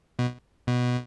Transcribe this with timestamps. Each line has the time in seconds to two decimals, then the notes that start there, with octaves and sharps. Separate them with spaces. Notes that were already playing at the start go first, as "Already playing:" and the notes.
0.19 B2
0.67 B2